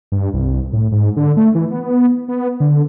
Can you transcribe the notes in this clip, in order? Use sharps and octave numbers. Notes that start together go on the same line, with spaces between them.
G2
C2
A2
G#2
D3
A3
E3
B3
B3
D3